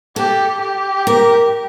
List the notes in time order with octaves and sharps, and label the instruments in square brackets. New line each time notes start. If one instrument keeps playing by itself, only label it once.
[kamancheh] G4 [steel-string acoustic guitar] A4
[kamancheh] G4
[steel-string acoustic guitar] A#4